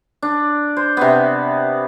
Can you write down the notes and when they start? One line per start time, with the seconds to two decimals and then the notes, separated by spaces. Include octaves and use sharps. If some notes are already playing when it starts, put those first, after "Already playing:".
0.22 D4
0.77 C5
0.97 C3 B3